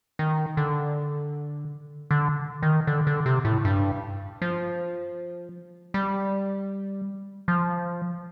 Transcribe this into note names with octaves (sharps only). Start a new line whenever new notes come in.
D#3
D3
D3
D#3
D3
D3
C3
A2
G2
F3
G3
F3